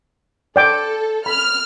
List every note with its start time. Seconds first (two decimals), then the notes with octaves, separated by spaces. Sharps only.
0.56 A4 D5 G5 D6
1.26 B5 F6